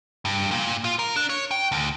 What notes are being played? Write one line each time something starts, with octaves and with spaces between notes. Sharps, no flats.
G2
A#2
F4
A#4
D4
C#5
G5
D2